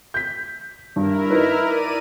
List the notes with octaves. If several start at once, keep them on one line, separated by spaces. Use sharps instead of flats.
G6 B6
G2 E4 A#4
D#4 B4
D5 D#7